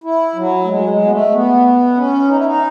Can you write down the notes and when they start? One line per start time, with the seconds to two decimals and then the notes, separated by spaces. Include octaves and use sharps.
0.04 E4
0.35 F#3
0.64 A3
0.68 G#3
0.89 G#3
1.05 B3
1.11 A3
1.32 B3
1.95 C#4
2.28 D#4
2.36 E4
2.45 D#4